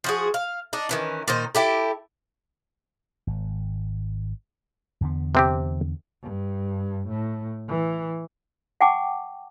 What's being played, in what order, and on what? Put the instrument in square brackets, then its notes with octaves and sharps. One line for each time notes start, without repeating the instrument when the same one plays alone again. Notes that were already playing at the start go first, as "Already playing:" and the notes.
[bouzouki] F3 F#4 G#4
F5
D4 D#4
D#3 E3 C#4
A#2 D#3 D#4 C5
E4 G4 A4
[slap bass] G#1
E2 D3 B3
[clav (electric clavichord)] C3 C4 G4
[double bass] G2
A2
E3
[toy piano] F#5 G5 A5 C#6 D6